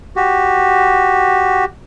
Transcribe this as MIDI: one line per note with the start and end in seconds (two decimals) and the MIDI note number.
0.16 1.65 66
0.16 1.65 67